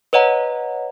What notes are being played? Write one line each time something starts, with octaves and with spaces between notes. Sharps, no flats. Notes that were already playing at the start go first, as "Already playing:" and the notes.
B4 C#5 D#5 F#5 A#5